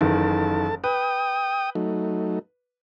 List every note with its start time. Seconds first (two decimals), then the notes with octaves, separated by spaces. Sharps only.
0.01 F#1 D#3 E3 A4 A5
0.84 B4 G5 D#6
1.75 F#3 A3 D#4